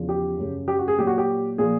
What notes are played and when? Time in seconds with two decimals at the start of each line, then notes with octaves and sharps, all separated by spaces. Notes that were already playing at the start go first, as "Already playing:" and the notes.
Already playing: E2 C#3 F3
0.09 G4
0.38 F#2 C#3 F#3
0.68 G4
0.79 F#4
0.88 G#4
0.98 A#2 F#3 G4
1.07 F#4
1.18 G4
1.58 A#2 F3 G#4